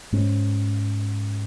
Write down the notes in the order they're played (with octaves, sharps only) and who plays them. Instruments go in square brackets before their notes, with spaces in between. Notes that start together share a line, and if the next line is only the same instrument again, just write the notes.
[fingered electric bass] G#2 G#3 C#4